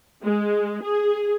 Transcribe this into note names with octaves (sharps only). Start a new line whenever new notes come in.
G#3
G#4